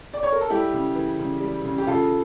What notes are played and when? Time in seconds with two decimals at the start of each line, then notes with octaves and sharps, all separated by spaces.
0.14 D5
0.23 C#5
0.32 A#4
0.41 A4
0.50 G3 E4 G4
0.73 C#3
0.96 E3
1.19 C#3
1.41 G3
1.65 C#3
1.78 G4
1.87 C#3 F4 A4